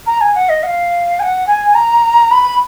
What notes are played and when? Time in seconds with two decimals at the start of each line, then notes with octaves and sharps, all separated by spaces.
0.06 A#5
0.21 G#5
0.35 F#5
0.49 D#5
0.63 F#5
0.66 F5
1.19 G#5
1.22 F#5
1.47 G#5
1.75 A#5
2.31 B5